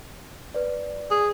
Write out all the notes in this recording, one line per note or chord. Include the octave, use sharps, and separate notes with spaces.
B4 D5
G#4